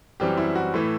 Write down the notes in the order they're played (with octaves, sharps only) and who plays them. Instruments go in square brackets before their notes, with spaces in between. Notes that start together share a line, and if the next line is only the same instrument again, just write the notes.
[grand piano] F#2 E3 G3 C4 G4
E4
F#4
A2 E3 A3 E4